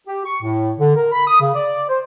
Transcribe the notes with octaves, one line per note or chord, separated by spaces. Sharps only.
G4
C#6
A2
D3
A#4
B5
D#6
C#3
D5
C5